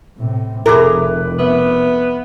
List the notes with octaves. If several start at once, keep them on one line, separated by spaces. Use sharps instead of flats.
A2 C3
F1 E4 G#4 A#4 B4 D6
B3 E5